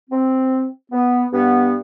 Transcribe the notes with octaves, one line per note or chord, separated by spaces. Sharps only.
C4
B3
G2 B3